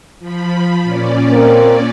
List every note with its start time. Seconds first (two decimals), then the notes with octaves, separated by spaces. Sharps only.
0.19 F3 B5
0.82 A#2 C#4 D5
1.32 A#3 C4 A#4